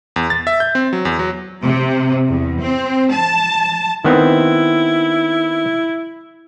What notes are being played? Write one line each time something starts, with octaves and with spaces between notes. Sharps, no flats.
E2
A6
E5
G6
C4
F#3
E2
F#3
C3
E2
C4
A5
D#3 B3 C4 E4